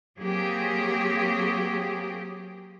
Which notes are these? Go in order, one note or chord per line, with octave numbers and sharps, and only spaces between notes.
F#3 A#3 C4 G4 G#4